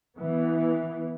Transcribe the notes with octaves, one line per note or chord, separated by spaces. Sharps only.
E3 B3